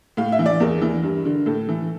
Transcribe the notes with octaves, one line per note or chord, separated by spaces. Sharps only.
A2 F5
E5
E3
D5
E2 A#4
E3
G2
D3
A2 A4
E3